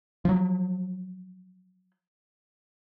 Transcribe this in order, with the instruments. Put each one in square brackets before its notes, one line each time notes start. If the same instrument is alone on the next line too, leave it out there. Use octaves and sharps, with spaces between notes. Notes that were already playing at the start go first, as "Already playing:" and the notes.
[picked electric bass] F3 F#3